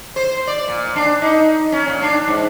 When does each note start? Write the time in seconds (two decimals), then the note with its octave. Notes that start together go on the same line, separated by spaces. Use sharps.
0.16 C5
0.47 D5
0.68 A#2
0.96 D4
1.22 D#4
1.72 C#4
1.88 A#2
2.02 D4
2.28 G#2